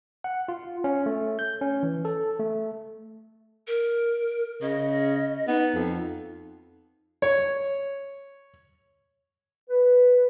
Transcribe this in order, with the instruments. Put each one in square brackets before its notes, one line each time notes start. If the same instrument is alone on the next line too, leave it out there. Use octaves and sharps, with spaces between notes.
[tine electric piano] F#5
F4
C#4
A3
G6
C#4
E3
A4
A3
[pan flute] A#4
[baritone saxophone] C#3 [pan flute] D#5
[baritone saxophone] B3 [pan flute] D#4
[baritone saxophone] F2
[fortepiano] C#5
[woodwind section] B4